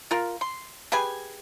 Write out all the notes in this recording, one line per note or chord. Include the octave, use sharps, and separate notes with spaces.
F4 A#4
C6
G4 G#4 B4 G#5